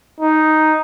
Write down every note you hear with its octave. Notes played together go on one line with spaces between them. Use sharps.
D#4